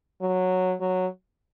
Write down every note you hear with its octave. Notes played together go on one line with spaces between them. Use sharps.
F#3
F#3